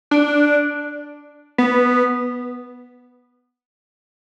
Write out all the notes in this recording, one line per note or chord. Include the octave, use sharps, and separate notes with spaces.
D4
B3